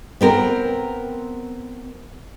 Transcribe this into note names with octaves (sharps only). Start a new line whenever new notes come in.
B3 C4 A#4